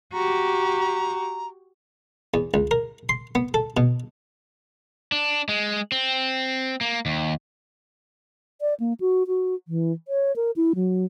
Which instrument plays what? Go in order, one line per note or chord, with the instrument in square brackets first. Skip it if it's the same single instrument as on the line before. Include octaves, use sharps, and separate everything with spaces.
[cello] F#4 G4 [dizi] A#5
[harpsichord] E2
C#2
A#4
C6
B3
A4
B2
[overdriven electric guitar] D4
G#3
C4
A#3
D#2
[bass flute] D5
A#3
F#4
F#4
E3
C#5
A#4
E4
F#3